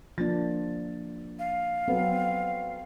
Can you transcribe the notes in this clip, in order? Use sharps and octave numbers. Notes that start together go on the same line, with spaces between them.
F3 A#3 D4 A6
F5
F#3 B3 C4 A4